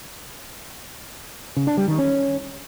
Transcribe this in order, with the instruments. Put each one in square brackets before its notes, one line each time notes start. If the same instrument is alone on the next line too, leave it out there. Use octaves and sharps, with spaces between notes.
[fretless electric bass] C#3
D4
G3
D#3
C#4